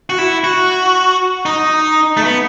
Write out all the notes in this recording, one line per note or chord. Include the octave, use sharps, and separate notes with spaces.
F#4
E4
F#4
D#4
A3
B3